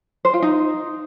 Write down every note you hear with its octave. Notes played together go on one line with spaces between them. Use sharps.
C5
F4
D#4